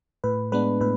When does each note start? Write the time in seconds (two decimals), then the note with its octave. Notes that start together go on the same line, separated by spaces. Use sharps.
0.24 A2 B4
0.52 G#3 B3 D4 B4
0.81 A2 B4